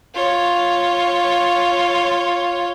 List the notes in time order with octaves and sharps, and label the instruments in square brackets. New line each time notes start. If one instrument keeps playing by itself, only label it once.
[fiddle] F4 C#5